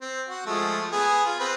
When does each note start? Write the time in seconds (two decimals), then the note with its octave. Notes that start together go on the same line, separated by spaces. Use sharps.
0.01 C4
0.29 F#4
0.46 F3 G#3 A3
0.93 B3 G#4
1.26 F4
1.39 C4 B4